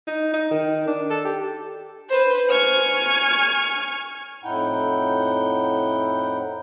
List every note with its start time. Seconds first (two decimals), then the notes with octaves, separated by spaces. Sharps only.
0.07 D#4
0.33 D#4
0.51 D#3
0.87 D4
1.10 A4
1.25 G4
2.08 B4 C5
2.49 G#5 C#6 F6
4.44 F2 A2 D#4 E4 F#5 G5